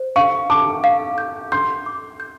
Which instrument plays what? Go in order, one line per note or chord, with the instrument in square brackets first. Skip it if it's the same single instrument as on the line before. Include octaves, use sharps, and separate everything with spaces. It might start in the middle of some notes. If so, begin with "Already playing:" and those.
Already playing: [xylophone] C5
[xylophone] F5 [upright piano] C#6
[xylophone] A5 [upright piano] D6
[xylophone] F5
G6
[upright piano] C6 [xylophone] G6
[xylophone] D6
G6